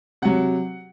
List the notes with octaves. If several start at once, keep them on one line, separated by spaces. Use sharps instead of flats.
C3 F#3 F#5